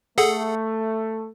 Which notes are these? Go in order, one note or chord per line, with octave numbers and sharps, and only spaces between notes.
A3 G#4 A4 F#5